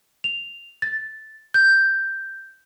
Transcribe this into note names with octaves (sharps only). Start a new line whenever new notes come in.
F7
A6
G6